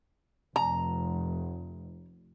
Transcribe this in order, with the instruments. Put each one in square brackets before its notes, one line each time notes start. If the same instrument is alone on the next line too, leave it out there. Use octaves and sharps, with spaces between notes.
[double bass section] F1 [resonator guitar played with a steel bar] A#5